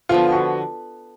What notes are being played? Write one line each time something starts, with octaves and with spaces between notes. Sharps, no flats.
D3 F3 B3 F4
F#4